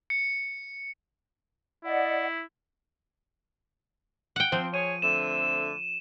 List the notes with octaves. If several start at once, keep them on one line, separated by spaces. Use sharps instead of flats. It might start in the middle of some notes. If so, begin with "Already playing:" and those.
C#7
E4 D5 D#5 F#5
F#5 G5
F3 C4
G#4 C#5 D#7
D3 A3 C4 E7